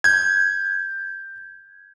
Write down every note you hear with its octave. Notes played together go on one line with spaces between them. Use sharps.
G6 G#6